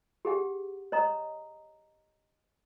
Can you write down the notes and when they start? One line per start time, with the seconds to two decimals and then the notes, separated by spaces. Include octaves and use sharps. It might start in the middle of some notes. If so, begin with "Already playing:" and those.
0.25 G4 G#4 F#5 G5
0.92 C#5 D#5 A#5 D#6